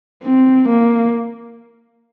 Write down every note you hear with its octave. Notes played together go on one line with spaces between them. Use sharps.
C4
A#3